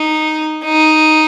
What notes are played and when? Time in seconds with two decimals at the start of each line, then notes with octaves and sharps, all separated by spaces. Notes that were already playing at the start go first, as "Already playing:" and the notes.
Already playing: D#4
0.64 D#4